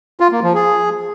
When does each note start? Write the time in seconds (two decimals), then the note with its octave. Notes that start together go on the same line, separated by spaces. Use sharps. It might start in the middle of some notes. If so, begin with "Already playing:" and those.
0.20 F4
0.32 A#3
0.43 F3
0.54 G#4